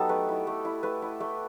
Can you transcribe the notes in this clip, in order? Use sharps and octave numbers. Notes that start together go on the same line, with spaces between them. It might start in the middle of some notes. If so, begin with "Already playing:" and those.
Already playing: F#3 B3 D#4 G4 A4
A3 B4
E4
A3
E4
A3 B4
E4
A3